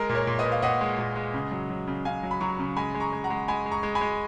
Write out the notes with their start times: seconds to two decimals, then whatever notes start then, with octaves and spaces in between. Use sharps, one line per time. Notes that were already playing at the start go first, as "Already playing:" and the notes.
Already playing: G#3 A#4
0.09 A#2
0.15 A#4 C#5
0.27 A#2
0.39 B4 D#5
0.45 A#2
0.52 F5
0.62 A#2 D#5 F#5
0.81 G#3
0.99 A#2
1.16 G#3
1.34 C#3
1.51 F#3
1.70 F#3
1.87 C#3
2.05 C#3 F5 G#5
2.23 F#3
2.31 B5
2.41 F#3 A#5 C#6
2.59 C#3
2.76 G#3 G#5 B5
2.95 G#3
3.00 A#5 C#6
3.12 G#3
3.24 F#5 A#5
3.30 G#3
3.48 G#3 G#5 B5
3.66 G#3
3.71 A#5 C#6
3.83 G#3
3.95 G#5 B5
4.01 G#3